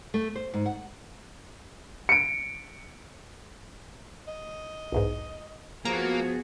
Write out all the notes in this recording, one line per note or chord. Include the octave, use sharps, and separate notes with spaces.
A3
C5
G#2
F#5
C#7 D7
D#5
B1 E2 G#2
F3 A#3 B3 F#4 G#4 A#5